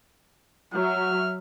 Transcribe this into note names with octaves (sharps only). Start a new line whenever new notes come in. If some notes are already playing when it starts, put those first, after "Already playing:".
F#3 E5 F6